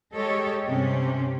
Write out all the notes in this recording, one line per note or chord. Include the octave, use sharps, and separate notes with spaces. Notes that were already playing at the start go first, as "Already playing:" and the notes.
G#3 G4 A4 C#5 D#5
G2 C3 C#4 G4